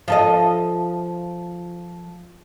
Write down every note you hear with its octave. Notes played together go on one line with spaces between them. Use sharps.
F3 A4 D#5